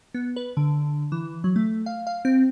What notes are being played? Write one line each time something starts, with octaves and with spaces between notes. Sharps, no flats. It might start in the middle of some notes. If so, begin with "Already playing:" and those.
B3
B4
D3
E3
F#3
A3
F5
F5
C4